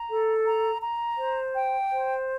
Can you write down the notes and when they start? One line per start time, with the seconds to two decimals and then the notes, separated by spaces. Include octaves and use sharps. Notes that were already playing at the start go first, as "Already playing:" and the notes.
Already playing: A#5
0.09 A4
0.46 A#5
0.81 A#5
1.17 C5
1.53 G5
1.90 C5